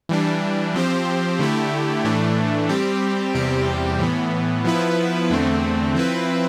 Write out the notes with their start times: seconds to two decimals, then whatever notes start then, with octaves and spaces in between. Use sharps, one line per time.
0.09 E3 G3 D4
0.74 F3 C4 G4 C5
1.39 D3 A3 E4 G4
2.04 A2 E3 A3 D4
2.69 G3 C4 G4
3.34 E2 C3 G3 C4 G4
3.99 A2 E3 B3
4.64 F3 B3 E4 B4
5.30 E2 D3 A3 C4
5.95 F3 C4 E4 B4